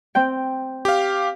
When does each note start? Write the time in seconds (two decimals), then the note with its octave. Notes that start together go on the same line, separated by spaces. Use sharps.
0.15 C4 G5
0.85 G4 F5